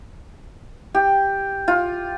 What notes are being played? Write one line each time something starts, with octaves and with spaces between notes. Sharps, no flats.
G4
F4